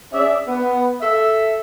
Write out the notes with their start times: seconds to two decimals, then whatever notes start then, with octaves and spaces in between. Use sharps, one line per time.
0.11 C#4 D4 G#4 D5 E5
0.48 B3
1.01 A4 E5